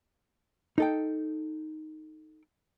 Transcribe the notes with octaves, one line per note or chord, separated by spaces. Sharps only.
D#4 A4 G5